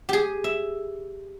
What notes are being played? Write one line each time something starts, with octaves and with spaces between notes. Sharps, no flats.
G4 G#4
E5